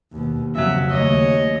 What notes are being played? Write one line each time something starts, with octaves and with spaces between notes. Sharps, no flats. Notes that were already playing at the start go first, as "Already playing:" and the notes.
D#2 B2
F2 C#3 F#3 E5
D#2 A3 C#5 D#5